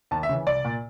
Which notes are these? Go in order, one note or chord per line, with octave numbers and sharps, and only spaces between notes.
D#2 A5
E5
C#3 E3
C2 D5
A#2